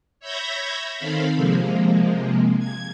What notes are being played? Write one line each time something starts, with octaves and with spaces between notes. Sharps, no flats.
C#5 E5 B5 G6 G#6 A#6
D#3 C4 A4 F5 B5
C3 F3 G#3 A#3
G#6